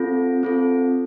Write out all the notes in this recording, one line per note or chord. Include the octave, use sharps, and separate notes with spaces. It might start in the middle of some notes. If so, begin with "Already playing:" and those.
Already playing: C4 F4 A4
C4 F4 A4